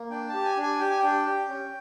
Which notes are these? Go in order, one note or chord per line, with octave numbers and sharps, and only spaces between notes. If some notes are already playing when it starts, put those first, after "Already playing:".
Already playing: A#3
D4 G5
A5
G4
G#5
D4
G#5
G4 G5
G#5
D4 G5
G4
C#4